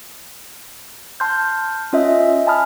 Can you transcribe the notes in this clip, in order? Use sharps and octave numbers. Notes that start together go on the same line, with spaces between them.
A5 C6 F6 G6
C#4 F4 D#5 E5
G#5 A5 B5 D#6 F6